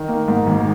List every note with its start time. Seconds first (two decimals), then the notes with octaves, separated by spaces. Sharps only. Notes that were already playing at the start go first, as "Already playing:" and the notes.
Already playing: D#3
0.08 A#3
0.28 G#2
0.47 G#1